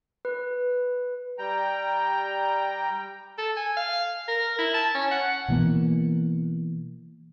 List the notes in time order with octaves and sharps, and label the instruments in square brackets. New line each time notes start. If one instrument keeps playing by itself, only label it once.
[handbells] B4
[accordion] G3 G5 A#5
[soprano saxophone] A4
G#5
F5
A#4
E4
A5
C#4
F#5
[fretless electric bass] B2 E3 A#3